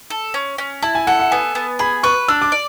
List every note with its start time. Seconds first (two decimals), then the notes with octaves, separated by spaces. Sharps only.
0.10 A4
0.34 C#4
0.58 C#4
0.82 E4 A5
0.95 G#5
1.07 A4 F#5
1.20 F#5
1.31 B3 G#5
1.55 B3
1.79 G#4 B5
2.03 B4 C#6
2.28 D4 E6
2.42 D6
2.52 D5